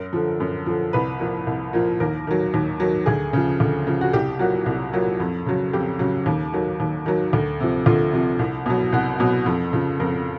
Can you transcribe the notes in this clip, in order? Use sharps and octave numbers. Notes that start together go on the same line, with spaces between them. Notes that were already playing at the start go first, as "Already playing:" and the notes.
Already playing: F#2 A#4
D3 F3
F#2
D3 F3
C2 B4
A#2 F3
C2
A#2 F3
D#2 A#4
D#3 F#3
D#2
D#3 F#3
D2 G#4
C#3 F3
D2
C#3 F3
F#4
C2 G4
A#2 F#3 F#4
C2
A#2 F#3
F2
C#3 F#3
F2 G4
C#3 F#3
D#2
D#3 F#3
D#2
D#3 F#3
D2
C3 F3
D2 F4
C3 F3
C2
B2 F#3
C2 F#4
B2 F#3
F2
C#3 F3
F2 A#4